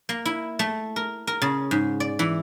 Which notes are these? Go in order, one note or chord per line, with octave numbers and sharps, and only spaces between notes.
A#3
E4
A3
A#4
A#4
C#3
G#2
D5
E3